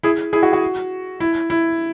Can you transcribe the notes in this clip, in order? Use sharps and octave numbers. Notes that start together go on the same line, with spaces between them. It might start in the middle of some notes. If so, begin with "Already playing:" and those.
E4 G#4
E4 G#4
F#4
F#4
E4
E4